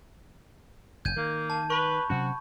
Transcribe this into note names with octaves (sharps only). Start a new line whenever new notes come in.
F#1 C#3 G6 G#6 D#7
D#3 A#3
A5
B4 B5 C#6
C3 F#3 C4 C#4 F#4